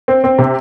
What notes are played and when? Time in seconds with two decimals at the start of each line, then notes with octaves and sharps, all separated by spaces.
0.08 C4
0.24 C4
0.38 C3